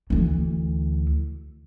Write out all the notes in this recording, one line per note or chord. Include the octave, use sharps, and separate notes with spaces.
D2 E3